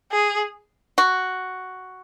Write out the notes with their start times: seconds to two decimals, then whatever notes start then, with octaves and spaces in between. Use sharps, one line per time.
0.11 G#4
0.98 F#4